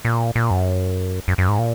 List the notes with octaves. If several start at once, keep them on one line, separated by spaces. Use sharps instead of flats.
A#2
A#2
F#2
F#2
F#2
G#2
A#2